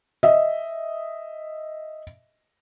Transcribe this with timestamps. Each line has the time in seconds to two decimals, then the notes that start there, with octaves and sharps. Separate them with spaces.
0.23 D#5 E5